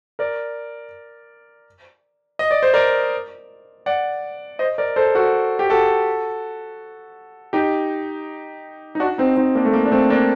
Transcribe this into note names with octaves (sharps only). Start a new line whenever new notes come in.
A#4 D5
D#5
D5
C5
A#4 D5
D5 F#5
C5 D#5
A#4 D5
A4 C5
F#4 A4
G4
F#4 A4
D#4 G4
D#4
D4 F#4
C4 D#4
C4 D#4
A#3 D4
A3
A#3
D4
A3 C4
A#3 D4